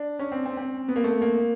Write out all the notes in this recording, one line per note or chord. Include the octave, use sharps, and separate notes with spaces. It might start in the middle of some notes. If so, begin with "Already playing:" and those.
Already playing: D4
C#4
C4
C4
C4
B3
A#3
A3
A#3
A#3